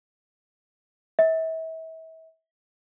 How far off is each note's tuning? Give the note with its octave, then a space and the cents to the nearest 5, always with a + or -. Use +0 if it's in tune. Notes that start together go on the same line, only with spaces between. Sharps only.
E5 -35